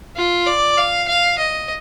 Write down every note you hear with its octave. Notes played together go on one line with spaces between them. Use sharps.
F4
D5
F5
F5
D#5